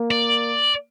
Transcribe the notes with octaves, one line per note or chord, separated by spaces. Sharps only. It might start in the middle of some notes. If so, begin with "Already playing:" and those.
Already playing: A#3
D5